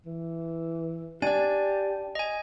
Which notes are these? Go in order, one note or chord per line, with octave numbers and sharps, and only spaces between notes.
E3
D4 G4 D5 G#5
D#5 G#5